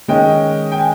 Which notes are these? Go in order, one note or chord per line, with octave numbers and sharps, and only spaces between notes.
D#3 G#3 C#4 D#5 G5
G5
G#5